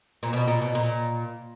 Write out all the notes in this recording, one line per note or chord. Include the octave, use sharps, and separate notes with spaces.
A#2
B2
A#2
B2
A#2